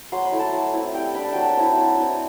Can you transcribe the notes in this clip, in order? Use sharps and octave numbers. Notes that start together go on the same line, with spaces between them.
F#3 C6
B5
A3 E4
A5
F#3
C4 E4
G3 G5
D4 B5
A5
F#3 G5
A5
C4 E4
F#3
C4 E4